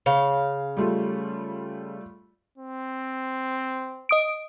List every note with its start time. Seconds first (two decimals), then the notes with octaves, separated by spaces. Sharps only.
0.06 C#3 F5
0.77 G3 A3 F4
2.58 C4
4.09 D#5 D#6 D7